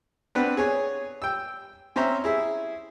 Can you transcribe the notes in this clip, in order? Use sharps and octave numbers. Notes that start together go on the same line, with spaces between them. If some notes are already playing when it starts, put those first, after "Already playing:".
B3 C4 D4 B4 F#5
G#4 C#5 G#5
G5 E6
C4 C#4 C5 C#5 E5 A#5
E4 G#4 E5